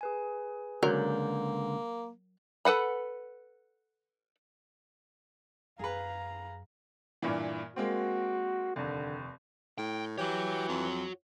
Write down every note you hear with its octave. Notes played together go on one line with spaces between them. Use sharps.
G#4 B4 G#5
C#2 D3 F#3 A#3 A#4
A4 B4 F#5 B5
F#2 G#4 B4 F5 A#5
G2 A#2 E3
G#3 A#3 C4 F#4
F1 D#2 D3
A2 G5
E3 F#4 G4 C#5
F2